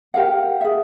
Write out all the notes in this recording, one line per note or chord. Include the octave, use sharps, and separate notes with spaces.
G4 A#4 F5 F#5
G#4 E5